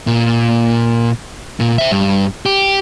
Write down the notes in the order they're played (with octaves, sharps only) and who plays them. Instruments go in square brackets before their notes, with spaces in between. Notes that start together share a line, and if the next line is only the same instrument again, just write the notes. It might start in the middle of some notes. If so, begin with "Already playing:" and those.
[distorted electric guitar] A#2
A#2
C5 E5
G2
G4